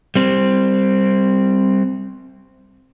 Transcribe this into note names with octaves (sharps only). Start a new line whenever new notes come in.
G3 C4